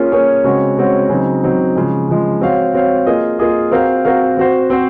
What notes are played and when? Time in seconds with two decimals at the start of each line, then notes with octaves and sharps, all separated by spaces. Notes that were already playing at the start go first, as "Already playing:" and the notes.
Already playing: A#3 C#4 F4 G#4 C#5
0.12 A#3 C#4 F4 G#4 C#5
0.44 C#3 G#3 C4 F#4 C#5
0.77 C#3 G#3 C4 F#4 C#5
1.09 C#3 F#3 C4 D#4
1.43 C#3 F#3 C4 D#4
1.76 C#3 F3 G#3
2.09 C#3 F3 G#3
2.41 C4 F#4 C#5 F5
2.74 C4 F#4 C#5 F5
3.06 A#3 F4 G#4 D#5
3.39 A#3 F4 G#4 D#5
3.72 C4 F#4 A#4 F5
4.05 C4 F#4 A#4 F5
4.37 C4 F#4 C5
4.70 C4 F#4 C5